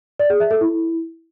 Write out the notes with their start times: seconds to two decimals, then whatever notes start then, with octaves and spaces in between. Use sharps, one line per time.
0.20 D5
0.30 G#4
0.40 E5
0.51 A4
0.61 E4